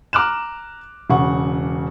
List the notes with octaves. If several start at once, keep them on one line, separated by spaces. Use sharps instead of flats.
A#5 D6 F6 F#6 E7
E1 C#3 F#5 C#6